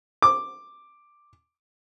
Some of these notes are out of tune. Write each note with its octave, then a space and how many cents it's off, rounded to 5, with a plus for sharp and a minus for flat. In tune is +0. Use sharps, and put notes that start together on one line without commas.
D6 +5